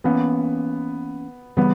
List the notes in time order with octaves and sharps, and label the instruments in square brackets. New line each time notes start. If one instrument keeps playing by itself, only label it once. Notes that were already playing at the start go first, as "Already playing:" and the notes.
[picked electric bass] E3 A#3 C#4 [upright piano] B3
[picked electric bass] C#3 E3 G3 [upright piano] B3